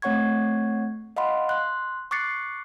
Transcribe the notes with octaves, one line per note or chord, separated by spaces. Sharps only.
A3 C4 C#5 F#5 C#6 G#6
D#5 F5 F#5 B5 C6
C6 F#6
C#6 D6 F#6 A6 C7 C#7